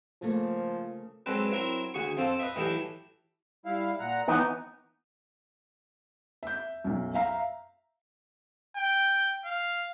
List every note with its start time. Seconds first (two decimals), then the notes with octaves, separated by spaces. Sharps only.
0.22 C#3 F3 A3 A#3
1.26 F#3 G#3 C4 A4 B4
1.51 F#3 C4 E4 A#4
1.94 D2 F#4 G#4 C#6
2.17 F2 F3 C4 A4
2.39 B4 D#5 E5
2.56 A2 E3 F#3 E4 G4 A4
3.66 G3 E4 F5
4.00 A#2 F#5 A#5
4.28 E3 B3 D#4 F#5
6.43 E5 G6
6.84 B1 F#2
7.14 E5 F5 A#5
8.76 G5
9.45 F5